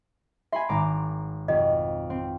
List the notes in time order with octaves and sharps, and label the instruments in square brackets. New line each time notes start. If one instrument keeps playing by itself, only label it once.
[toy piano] E5 [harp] G#5 B5 C6
[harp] G#1 A#5 D6
[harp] F2 B2 [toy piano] D#5
[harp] C4